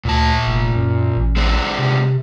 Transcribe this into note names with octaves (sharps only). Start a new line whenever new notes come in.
D2 A#2 A5
F1
F#2
A1
G#3 C4 D4
C3